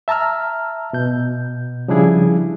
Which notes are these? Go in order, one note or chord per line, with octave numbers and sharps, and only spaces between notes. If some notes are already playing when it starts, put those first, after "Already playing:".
E5 A5 A#5 E6 F6
B2 G6
C#3 F3 G3 D4 E4 G#4